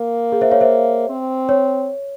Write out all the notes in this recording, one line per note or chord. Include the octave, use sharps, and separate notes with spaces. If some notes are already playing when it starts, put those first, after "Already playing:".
Already playing: A#3
G#4
C5 E5
C#5 F5
C5 E5
C4
C#5